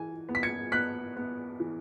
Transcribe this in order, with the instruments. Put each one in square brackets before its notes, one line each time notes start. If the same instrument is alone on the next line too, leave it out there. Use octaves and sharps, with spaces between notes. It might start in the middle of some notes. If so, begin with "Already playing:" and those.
Already playing: [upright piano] E3 G#5
B3
B6
G#6 C#7
B3 F#6 B6
B3
E3